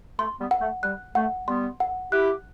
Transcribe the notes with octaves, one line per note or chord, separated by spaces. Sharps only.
A3 C6
G3 B3
F#5
A3
G3 F#6
A3 F#5
G3 B3 C6
F#5
E4 G4 F#6